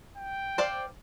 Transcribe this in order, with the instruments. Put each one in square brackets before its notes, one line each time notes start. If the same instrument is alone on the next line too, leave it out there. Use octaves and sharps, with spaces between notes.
[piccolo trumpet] G5
[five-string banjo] C5 D5 F5